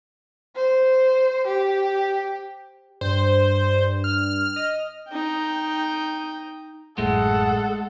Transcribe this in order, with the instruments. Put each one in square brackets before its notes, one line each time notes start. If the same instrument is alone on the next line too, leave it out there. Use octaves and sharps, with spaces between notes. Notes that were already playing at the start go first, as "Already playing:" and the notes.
[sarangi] C5
G4
[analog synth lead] G2 [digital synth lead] C5
[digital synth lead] F6
[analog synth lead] D#5
[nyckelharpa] D#4 G5
[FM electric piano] A1 F#2 A2 [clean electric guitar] G#3 A3 [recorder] G#4 [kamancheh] A4 F#5